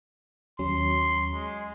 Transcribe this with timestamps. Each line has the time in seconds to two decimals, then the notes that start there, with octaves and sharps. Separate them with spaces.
0.59 D#2 F#3 C#4 C6
1.33 G#3